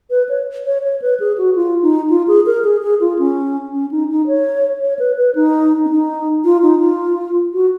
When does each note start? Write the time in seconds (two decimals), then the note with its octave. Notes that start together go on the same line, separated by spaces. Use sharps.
0.10 B4
0.29 C#5
0.65 C#5
0.83 C#5
1.02 B4
1.20 G#4
1.38 F#4
1.55 F4
1.82 D#4
2.10 F4
2.28 G#4
2.46 A#4
2.64 G#4
2.82 G#4
3.00 F4
3.19 C#4
3.73 C#4
3.91 D#4
4.10 D#4
4.27 C#5
4.81 C#5
4.99 B4
5.18 B4
5.35 D#4
5.85 C#4
5.90 D#4
6.45 F4
6.62 D#4
6.80 F4
7.53 F#4